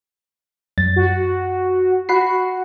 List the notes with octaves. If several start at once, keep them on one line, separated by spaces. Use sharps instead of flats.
F#2 A6
F#4
F#4 F#5 B5 C7